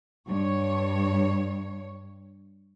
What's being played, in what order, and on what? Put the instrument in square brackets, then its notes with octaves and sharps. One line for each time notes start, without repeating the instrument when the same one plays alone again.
[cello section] G2 C#5